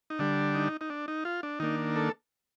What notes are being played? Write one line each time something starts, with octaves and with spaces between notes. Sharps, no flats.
D#4
D3 G3 D4
D#4
D#4
D4
D#4
F4
D4
D#3 A#3 D4 D#4
A4